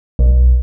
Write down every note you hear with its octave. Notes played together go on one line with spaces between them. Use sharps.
B1